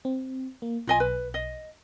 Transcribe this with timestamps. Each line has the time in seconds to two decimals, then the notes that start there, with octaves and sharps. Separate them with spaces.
0.05 C4
0.62 A#3
0.87 B1 F4 D#5 G#5
1.00 B4
1.34 D#5